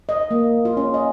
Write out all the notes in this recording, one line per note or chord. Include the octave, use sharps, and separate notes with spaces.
D#5
A#3
F4
C#4
D#5